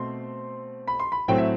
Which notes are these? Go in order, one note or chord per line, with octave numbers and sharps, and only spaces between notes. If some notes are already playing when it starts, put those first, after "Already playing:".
Already playing: B2 A3 C4 C6
B5
C6
B5
A2 F#3 A3 C4 G5
E5